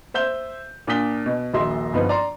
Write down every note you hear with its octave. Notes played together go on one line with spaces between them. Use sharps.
C5 E5 G6 G7
A#2 D4 F4 D#6 B6 G7
B2
D#1 A#1 F#4 D#5 E5 C6
G1 F3 B3 D#4 F4 B4
D5 A#5 C6